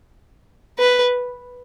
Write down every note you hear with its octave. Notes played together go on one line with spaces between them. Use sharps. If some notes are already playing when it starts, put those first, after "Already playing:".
B4